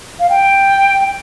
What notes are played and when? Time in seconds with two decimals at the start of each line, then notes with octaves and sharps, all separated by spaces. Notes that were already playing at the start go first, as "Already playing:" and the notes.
0.20 F5
0.29 G5